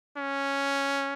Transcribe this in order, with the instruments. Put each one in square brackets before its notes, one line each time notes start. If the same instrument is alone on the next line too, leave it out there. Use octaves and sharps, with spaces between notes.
[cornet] C#4